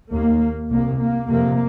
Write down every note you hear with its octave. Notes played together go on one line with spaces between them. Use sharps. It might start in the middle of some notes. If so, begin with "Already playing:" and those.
D#2 A#3
C2 C3 A#3
A#3
F2 C3 A#3